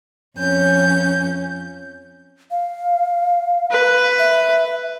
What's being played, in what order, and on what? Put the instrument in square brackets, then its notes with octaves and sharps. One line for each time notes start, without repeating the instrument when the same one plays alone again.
[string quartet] F2 C#4 G6
[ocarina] F5
[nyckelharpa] B4
[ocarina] E5